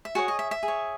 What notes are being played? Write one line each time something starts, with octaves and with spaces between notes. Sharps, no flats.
E5
F#4 G#4 C#5 F#5
D#5
E5
E5
G#4
C#5